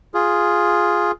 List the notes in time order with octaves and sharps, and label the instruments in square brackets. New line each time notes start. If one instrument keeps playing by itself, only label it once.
[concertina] F4 G#4